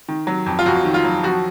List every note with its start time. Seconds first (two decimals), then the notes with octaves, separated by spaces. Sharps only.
0.08 D#3
0.27 F#3
0.46 F2
0.59 F4
0.66 F2 F#4
0.85 D#3
0.94 F4
1.05 F#3
1.23 F3 F#4